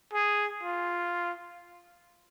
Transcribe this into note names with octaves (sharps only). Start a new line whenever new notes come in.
G#4
F4